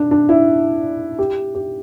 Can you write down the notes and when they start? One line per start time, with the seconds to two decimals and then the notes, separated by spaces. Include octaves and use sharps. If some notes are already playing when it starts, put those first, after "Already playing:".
Already playing: D4
0.11 D4
0.29 E4
1.19 G4
1.55 G4